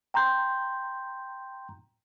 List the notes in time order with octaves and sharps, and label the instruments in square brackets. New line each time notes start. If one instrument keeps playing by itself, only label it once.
[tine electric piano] G5 A#5 C6 G6